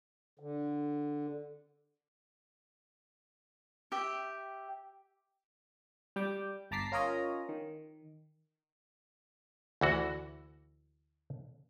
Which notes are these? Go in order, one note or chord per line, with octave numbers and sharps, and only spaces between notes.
D3
G4 E5 G5
G3 G5 D6
G1 A5 A#5 D6 B6 C7
C#4 F4 A#4 C#5 D#5 A#5
D#3
D2 E3 F#4